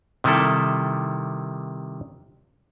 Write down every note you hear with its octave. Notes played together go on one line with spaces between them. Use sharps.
C3 D#3 G3 E4 A4